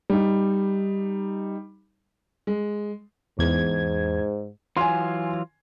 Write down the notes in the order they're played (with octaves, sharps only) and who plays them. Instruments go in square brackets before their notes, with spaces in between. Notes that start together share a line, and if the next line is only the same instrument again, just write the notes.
[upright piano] G3 D#4
[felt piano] G#3
[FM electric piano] E2 G#6 [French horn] G#2
[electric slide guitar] E3 F#3 F4 [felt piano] G#5 C6